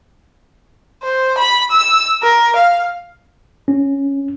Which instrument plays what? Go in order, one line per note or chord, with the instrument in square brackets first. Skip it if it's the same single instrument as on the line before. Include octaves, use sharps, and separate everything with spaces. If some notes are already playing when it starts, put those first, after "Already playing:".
[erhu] C5
B5
E6
A#4
F5
[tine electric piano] C#4